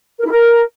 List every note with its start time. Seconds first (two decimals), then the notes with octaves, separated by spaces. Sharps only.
0.20 A#4
0.25 E4
0.31 A#4